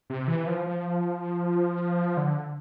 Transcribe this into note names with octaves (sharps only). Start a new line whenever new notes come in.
C3
E3
F3
F3
D3